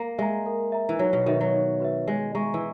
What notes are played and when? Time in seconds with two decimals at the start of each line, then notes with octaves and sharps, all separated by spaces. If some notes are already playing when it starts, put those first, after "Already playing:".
Already playing: A#3
0.18 G#3 E5 A#5
0.46 A#4
0.72 E5 A#5
0.89 E3
0.99 F#3 D#4
1.13 B2
1.26 D#3 F#4 B4 E5
1.41 F#3
1.54 D#4
1.80 F#4 B4 E5
2.08 G#3 C#5
2.35 G#3 E5 A#5 C#6
2.54 E3